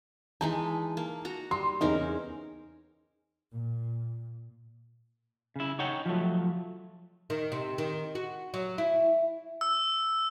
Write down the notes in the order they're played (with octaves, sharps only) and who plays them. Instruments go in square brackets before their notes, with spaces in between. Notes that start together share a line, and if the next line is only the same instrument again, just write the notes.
[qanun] E3 G#3 D#4 [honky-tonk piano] A5
[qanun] A#3
F#4 A#5
[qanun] G3 [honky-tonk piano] C6
[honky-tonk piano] E2 D#4 [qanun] C4 C#4 A#4
[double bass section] A#2
[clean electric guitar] C#3 E4
D#4 C#5 F#5 G5
F3 F#3 A3
[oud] D#3
C3
D#3
F#4
F#3
E4
[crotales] E6